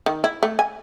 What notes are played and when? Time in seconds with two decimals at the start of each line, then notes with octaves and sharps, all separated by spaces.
0.06 D#3
0.24 E4
0.43 A3
0.59 G#5